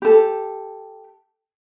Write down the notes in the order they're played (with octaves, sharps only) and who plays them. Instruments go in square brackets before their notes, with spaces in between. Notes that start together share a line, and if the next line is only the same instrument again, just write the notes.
[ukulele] G4 A4